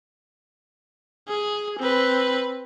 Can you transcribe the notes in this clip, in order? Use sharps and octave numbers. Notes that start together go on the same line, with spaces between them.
G#4
C4 B4